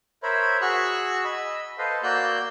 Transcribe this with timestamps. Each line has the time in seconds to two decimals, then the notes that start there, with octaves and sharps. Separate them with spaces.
0.23 A#4 C5 C#5 E5 B5
0.61 F#4 G#4 C#6 E6 F#6
1.24 D#5 B5 E6
1.78 A4 B4 C5 D#5 F5
2.03 A#3 F#4 D5 E6 F#6 G6